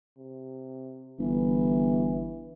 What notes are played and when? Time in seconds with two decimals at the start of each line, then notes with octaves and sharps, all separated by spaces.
0.18 C3
1.19 G1 E3